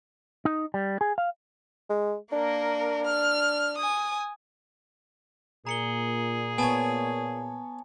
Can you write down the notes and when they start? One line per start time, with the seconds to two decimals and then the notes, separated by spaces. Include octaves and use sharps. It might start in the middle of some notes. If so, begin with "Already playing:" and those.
0.45 D#4
0.74 G3
1.01 G#4
1.18 F5
1.89 G#3
2.32 A#3 D4 A#4
3.07 F6
3.78 G#5 D#6
5.67 A#2 G#4 A#5 C#7 G7
6.58 B3 C#5 G#5 A5